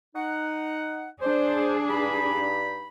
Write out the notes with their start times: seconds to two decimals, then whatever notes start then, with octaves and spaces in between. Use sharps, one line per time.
0.15 D#4 F#5
1.21 D4 G#4 C5
1.90 G2 D#4 B5